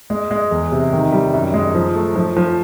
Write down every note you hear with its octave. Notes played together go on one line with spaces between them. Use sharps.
G#3
G#3
E2
C3
D#3
G3
F#2
G#3
F3
A3
F3
F3